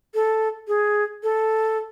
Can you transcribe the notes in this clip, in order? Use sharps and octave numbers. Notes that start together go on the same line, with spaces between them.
A4
G#4
A4